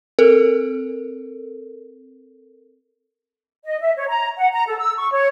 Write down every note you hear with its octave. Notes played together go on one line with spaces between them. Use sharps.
C4 A4 A#4
D#5
E5
C#5
A#5
F#5
A#5
A4
E6
C#6
C#5